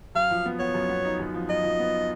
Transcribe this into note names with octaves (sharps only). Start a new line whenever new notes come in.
F#2 F5
F3
B3
B3 C#5
F#2
B3
D#4
F#2
F3
F#2 D#5
F3
B3